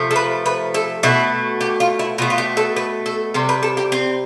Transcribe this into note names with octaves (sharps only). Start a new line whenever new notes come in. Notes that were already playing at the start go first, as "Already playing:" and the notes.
Already playing: C3 F3 A3
A4
B4
B4
A4
B2 A3 E4
G4
F4
E4
B2 A3 F4
F4
G4
A4
B4
A4
C3 G3 C4
B4
A4
G4
C4